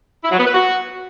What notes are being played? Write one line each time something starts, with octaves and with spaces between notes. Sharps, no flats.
E4
F#3
B3
B4
F#4